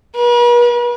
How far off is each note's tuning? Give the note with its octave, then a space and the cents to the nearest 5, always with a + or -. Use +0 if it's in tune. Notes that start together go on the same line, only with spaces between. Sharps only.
B4 -45